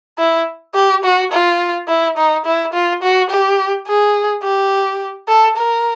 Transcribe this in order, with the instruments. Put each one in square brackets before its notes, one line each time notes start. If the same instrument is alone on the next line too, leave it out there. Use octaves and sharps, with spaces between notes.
[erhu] E4
G4
F#4
F4
E4
D#4
E4
F4
F#4
G4
G#4
G4
A4
A#4